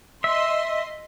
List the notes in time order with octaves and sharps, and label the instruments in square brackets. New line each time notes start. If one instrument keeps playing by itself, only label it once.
[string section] D#5 C6 [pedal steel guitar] E5